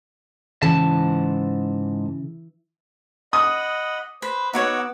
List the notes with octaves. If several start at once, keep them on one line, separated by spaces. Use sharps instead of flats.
G#2 C#3 E3 A5
D#5 F#5 B5 D#6
B4 C5
B3 D#4 F#4 C#5 F#5 D6 E6